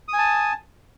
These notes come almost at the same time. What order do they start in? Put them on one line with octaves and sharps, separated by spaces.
D#6 G#5 A5